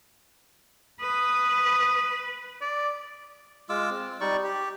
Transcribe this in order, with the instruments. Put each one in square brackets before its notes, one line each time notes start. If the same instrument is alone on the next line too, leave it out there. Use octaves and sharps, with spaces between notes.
[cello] B4 [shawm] D#6
[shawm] D5
[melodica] G#3 F4 D6 E6
C4
G3 D#4 D5 C#6
G4